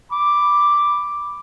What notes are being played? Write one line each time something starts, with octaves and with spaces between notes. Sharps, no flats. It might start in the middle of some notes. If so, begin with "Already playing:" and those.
B5 D6